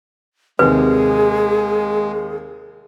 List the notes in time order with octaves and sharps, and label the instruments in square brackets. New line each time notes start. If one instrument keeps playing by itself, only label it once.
[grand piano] D#2 C3 [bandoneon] G#3 [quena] G#4 [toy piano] B4